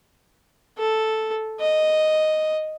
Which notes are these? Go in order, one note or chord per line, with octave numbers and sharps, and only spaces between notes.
A4
D#5